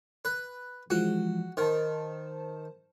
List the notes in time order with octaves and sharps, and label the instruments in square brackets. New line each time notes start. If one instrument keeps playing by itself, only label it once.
[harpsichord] B4
[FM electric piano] E3 F3 G#3 [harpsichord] F#4
[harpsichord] D#3 [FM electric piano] C5 A5